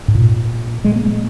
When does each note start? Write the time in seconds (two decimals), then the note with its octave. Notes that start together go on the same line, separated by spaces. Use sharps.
0.08 G#2
0.15 A#2
0.84 G#3
0.95 A#3
1.07 G#3